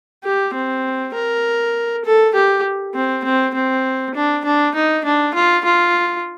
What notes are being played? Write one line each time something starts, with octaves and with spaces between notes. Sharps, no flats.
G4
C4
A#4
A4
G4
C4
C4
C4
D4
D4
D#4
D4
F4
F4